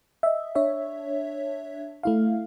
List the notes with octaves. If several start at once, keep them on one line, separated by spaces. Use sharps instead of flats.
D#5 E5
D4 C#5 E5
A3 E4 F5